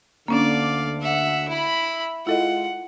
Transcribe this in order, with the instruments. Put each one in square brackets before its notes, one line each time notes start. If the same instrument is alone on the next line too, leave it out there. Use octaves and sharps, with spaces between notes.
[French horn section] D2 D3 [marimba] A#3 C#4 D4 [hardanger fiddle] D5 F5
[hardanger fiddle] E5 F#5
E4 B5
[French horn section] G#3 F4 [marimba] E4 A4 D#5 [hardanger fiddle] F#5